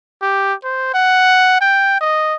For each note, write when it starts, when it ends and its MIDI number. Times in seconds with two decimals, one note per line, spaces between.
0.22 0.54 67
0.64 0.92 72
0.94 1.60 78
1.61 1.96 79
2.01 2.36 75